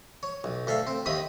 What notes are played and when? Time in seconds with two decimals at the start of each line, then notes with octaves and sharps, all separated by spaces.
0.23 C#5
0.44 B1
0.67 D2 A4 E5 F5
0.87 C4
1.06 D#2 D#3 E5 B5 D#6